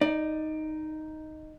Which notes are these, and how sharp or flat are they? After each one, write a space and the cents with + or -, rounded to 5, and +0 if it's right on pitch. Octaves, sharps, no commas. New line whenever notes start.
D#4 +0 D5 +20